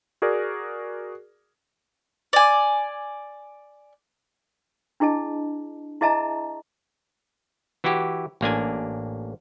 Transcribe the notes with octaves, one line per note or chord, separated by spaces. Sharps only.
F#4 G#4 A#4 D5
D5 G#5
D4 E4 G#4 D#5 A5
E4 G#4 D#5 E5 A5 A#5
E3 E4 F#4 G4
A1 A#3 D4 G#5